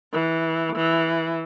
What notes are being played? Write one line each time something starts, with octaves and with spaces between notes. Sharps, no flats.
E3
E3